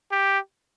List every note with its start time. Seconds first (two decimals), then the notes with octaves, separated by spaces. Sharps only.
0.12 G4